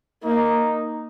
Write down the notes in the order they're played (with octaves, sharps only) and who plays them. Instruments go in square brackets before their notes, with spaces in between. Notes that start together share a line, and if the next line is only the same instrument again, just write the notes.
[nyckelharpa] A#3 [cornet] D#4